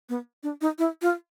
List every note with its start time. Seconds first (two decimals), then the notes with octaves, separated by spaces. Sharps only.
0.09 B3
0.43 D4
0.61 D#4
0.79 E4
1.02 F4